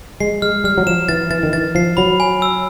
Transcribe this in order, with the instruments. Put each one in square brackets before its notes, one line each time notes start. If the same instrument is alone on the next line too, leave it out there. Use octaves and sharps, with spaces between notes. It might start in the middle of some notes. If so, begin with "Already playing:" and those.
[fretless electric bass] G#3 [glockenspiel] C7
[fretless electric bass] G#3 [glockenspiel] F6
[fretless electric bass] G3 [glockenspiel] F6
[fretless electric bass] F#3
[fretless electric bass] F3 [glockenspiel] E7
[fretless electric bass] E3 [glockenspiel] A6
[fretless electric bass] E3 [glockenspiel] A6
[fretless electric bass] D#3
[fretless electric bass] E3 [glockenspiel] A6
[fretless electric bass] F3 [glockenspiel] C7
[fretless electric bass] F#3 [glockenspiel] B5
[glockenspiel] G#5
E6